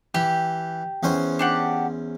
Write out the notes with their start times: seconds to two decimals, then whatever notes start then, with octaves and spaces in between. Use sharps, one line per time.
0.14 E3 G4
1.03 E2 C#4 C5
1.39 D4 G4 F#5